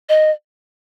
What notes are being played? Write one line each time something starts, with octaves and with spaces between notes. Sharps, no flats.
D#5